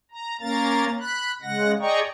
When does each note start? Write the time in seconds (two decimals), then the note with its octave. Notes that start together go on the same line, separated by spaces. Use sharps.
0.11 A#5
0.41 A#3 C#4 A#4 F5 A#5 A6
1.00 B5 F#6
1.42 C#3 G#3 F#5 A#6
1.79 G#4 D5 D#5 G5 A#5 C#6